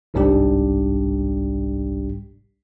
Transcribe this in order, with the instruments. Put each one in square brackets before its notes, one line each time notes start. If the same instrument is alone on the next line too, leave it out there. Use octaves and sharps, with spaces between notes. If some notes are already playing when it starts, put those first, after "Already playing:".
[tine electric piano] G1 C2 G#2 G3 D4 G4